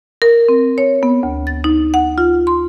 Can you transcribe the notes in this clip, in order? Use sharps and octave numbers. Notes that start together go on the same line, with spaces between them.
A#4
C4
C#5
B3
D2
A6
D#4
F#5
F4
C6